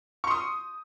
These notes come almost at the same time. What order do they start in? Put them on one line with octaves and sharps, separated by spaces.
C#6 C6 D#6